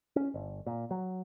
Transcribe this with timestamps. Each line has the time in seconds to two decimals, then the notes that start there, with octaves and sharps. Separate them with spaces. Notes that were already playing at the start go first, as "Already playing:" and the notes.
0.16 C#4
0.34 G1
0.66 A#2
0.91 F#3